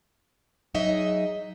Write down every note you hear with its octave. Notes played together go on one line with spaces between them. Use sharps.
F#3 D#4 G#4 D#5 E5